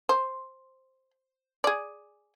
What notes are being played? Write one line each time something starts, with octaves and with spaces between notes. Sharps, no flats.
C5
G#4 D5